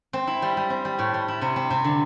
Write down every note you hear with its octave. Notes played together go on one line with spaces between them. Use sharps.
C4
E4
G3
G3
C4
G3
A2
G3
E4
C3
C4
C3
D3